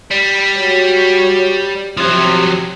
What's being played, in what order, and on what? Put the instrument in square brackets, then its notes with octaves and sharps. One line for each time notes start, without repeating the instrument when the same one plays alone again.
[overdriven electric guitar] G3
[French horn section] F#4 C#5
[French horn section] C3 [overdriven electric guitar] F3 F#3